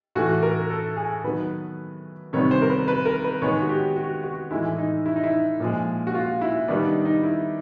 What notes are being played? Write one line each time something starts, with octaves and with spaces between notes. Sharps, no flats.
A2 E3 A3 F#4
A#4
A4
G#4
D#3 F#3 B3 B4
C3 D#3 G3 B3 C#5
C5
A#4
B4
B4
A#4
B4
D#3 G#3 B3 C#5
F#4
G4
F#4
F#4
A2 E3 G#3 E4
D#4
E4
D#4
E4
A#2 F3 G#3
F#4
F4
E4
D#3 G3 B3 D4
D#4
D#4
E4